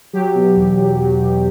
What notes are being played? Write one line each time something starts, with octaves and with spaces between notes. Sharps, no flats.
F#3 G4
B2
E2
E2
F#3
B2